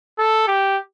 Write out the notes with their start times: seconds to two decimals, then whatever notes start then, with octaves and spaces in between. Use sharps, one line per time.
0.19 A4
0.48 G4